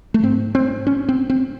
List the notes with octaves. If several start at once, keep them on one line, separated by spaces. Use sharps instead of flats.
A3
G#2 C4
C4
C#4
C4
C4